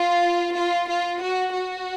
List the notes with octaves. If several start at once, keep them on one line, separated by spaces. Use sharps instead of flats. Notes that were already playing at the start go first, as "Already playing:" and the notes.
Already playing: F4
F4
F4
F#4
F#4